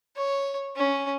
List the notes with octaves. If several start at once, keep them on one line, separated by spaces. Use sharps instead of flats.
C#5
C#4